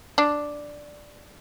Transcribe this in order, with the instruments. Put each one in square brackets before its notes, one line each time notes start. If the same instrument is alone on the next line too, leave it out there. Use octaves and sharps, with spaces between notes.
[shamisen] D4